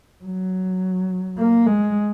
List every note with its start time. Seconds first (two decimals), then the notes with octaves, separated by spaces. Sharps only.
0.24 F#3
1.38 A#3
1.66 G#3